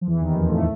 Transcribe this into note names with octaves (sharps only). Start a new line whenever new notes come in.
F3
E2 E3
D#2 D#3
F2 F3
A2 A3